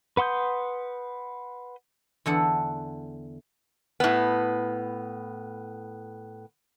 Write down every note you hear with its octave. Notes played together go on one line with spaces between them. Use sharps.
B4 F#5 C6 D#6 G6
E2 D3 A4 F#5
A2 B3